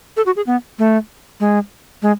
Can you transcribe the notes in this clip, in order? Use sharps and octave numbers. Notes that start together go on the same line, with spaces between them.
A4
F#4
G#4
B3
A3
G#3
G#3